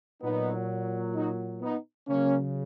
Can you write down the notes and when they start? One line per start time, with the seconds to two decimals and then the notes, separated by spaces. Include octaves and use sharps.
0.22 A#2 F#3 B3 D#4
1.15 D#4 F#4
1.61 B3 D#4
2.08 C#3 F#3 A#3 C#4